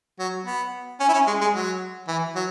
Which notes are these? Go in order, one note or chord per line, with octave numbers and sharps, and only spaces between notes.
F#3
B3
C#4
E4
C#4
G#3
G#3
F#3
E3
F#3